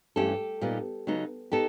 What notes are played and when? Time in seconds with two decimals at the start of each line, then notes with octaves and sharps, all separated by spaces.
0.16 G2 E3 A3 C#4 G4 A4
0.61 A#2 G3 B3 D#4
1.07 C#3 F#3 B3 D#4
1.52 B3 D#4 G4 A4